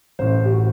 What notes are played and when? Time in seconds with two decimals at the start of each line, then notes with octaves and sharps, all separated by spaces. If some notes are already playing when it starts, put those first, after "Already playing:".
0.19 A1 A2 C5
0.45 G4
0.52 F#4